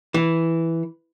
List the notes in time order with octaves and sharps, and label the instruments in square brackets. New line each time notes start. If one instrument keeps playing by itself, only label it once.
[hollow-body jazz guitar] E3